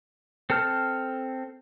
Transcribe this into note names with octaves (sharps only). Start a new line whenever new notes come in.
C4 A4 A5 F6 G6